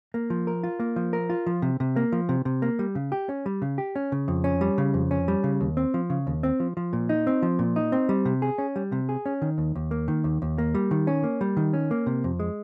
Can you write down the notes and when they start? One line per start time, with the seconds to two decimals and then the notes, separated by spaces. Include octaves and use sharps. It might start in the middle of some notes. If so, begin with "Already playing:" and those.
0.14 A#3
0.30 F3
0.47 A#4
0.64 F4
0.80 A#3
0.96 F3
1.13 A#4
1.30 F4
1.47 F3
1.62 C3
1.80 C3
1.96 A#3
2.12 F3
2.29 C3
2.45 C3
2.62 A#3
2.79 G3
2.95 C#3
3.12 G4
3.29 C#4
3.46 G3
3.62 C#3
3.78 G4
3.96 C#4
4.12 C#3
4.28 F2
4.44 C#4
4.61 G3
4.78 C#3
4.94 F2
5.11 C#4
5.28 G3
5.44 C#3
5.61 D#2
5.77 C4
5.94 F3
6.10 C#3
6.27 D#2
6.43 C4
6.60 F3
6.77 F3
6.93 A#2
7.09 D#4
7.27 C4
7.42 F3
7.59 A#2
7.76 D#4
7.92 C4
8.09 G3
8.25 C3
8.42 G#4
8.58 C#4
8.76 G3
8.92 C3
9.09 G#4
9.26 C#4
9.42 D#3
9.58 D#2
9.75 D#2
9.91 A#3
10.08 D#3
10.24 D#2
10.42 D#2
10.58 A#3
10.75 G3
10.91 D#3
11.07 C#4
11.24 A#3
11.41 G3
11.57 D#3
11.73 C#4
11.91 A#3
12.06 C3
12.24 F2
12.40 G#3